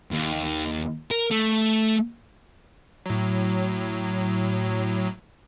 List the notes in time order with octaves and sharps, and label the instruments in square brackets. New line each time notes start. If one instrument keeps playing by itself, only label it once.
[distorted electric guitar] D#2
A#4
A3
[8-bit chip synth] A2 F#3